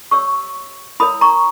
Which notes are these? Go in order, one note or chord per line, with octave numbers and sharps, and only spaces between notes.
G4 C#5 C#6 E6
E4 A#4 C#5 B5 D#6
A#5 C#6